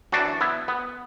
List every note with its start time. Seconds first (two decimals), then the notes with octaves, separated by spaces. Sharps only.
0.12 F#2 E3 D4 F#4
0.41 B3 E4
0.68 B3